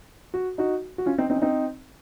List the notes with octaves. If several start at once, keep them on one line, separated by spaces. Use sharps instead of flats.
F#4
D#4 F#4
F#4
C#4 F4
C4 D#4
C4 D#4
C#4
C4 D#4